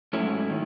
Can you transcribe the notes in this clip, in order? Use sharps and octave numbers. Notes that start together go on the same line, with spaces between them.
G#2 F#3 A3 C#4 E4
D#3